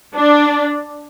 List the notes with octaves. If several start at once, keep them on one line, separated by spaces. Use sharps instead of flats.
D4